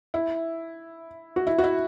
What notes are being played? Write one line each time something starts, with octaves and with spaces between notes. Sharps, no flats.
E4
F#4
E4
F#4
E4